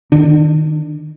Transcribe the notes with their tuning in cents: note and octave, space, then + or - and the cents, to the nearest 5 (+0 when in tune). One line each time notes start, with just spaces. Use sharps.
D#3 -10 D4 +25